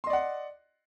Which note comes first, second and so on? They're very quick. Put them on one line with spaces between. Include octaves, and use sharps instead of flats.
C6 D#5 D5 F#5